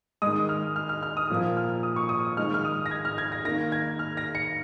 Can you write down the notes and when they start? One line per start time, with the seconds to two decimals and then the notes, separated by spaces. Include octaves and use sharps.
0.22 D#3 G#3 D#6
0.49 F6
0.76 F6
0.89 F6
1.03 F6
1.17 D#6
1.30 A#2 F3 A#3
1.57 F6
1.83 D#6
1.96 C#6
2.09 D#6
2.37 D#3 G#3 F6
2.54 F6
2.65 D#6
2.86 A#6
2.91 G#6
3.05 F6
3.18 G#6
3.32 A#6
3.45 D#3 A#3 A#6
3.72 G#6
3.99 F6
4.17 A#6
4.35 C#7